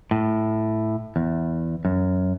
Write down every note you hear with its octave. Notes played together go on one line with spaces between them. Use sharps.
A2
E2
F#2